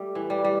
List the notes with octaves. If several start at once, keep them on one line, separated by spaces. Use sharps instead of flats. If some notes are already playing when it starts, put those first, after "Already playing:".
Already playing: G3 A3
E3
G3
G3